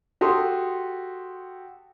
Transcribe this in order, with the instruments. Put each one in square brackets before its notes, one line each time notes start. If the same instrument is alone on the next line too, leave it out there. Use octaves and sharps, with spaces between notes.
[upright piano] F#4 G4 A4 C6 D#6